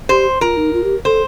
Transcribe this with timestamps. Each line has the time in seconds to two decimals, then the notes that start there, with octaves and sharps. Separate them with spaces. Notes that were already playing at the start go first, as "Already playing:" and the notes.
0.09 G4 C5
0.41 F4 A#4
0.57 D#4
0.73 F4
0.84 G4
1.05 A4 C5